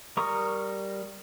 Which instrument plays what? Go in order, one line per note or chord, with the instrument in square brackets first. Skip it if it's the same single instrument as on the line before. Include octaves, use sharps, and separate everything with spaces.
[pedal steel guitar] G3 A#4 A#5 C#6 D#6